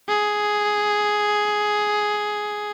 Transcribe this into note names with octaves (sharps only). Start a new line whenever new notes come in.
G#4